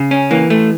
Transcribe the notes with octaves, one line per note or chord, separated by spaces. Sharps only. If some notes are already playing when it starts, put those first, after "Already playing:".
Already playing: C#3
C#4
E3 A#3
A3